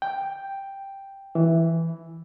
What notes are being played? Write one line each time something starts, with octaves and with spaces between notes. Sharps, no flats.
G5
E3